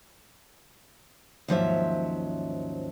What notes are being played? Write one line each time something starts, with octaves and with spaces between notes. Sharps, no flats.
D#2 G#2 F3 F#3 C#4 E5